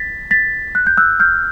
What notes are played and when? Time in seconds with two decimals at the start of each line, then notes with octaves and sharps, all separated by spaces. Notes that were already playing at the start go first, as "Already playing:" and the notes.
Already playing: A6 B6
0.31 A6 B6
0.75 F#6
0.87 G6
0.98 E6 F#6
1.20 F6 G6